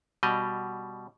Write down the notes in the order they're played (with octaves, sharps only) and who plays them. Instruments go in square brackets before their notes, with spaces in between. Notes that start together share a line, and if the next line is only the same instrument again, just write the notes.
[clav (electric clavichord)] B2 G3 D#5